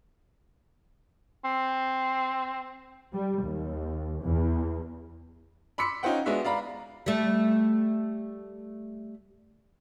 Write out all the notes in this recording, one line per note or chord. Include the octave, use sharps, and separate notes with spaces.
C4
G3
D#2
E2
B5 C6 D6 E6 B6 C#7
C#4 D#4 F4 C5 F#5 G5
G#3 B3 D4 F#4 E5
D5 F5 A#5 B5
G3 A3